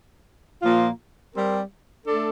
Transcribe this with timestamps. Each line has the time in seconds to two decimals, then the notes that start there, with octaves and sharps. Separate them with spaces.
0.62 A#2 F3 A#3 F4
1.34 G3 C4 G4 A#4
2.06 A3 D4 A4